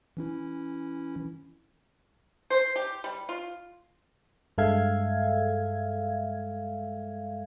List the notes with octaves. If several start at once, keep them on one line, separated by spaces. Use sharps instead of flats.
E3 C#4 E4
C5
G4
G3
F4
G2 G#3 A4 E5 F5 G#6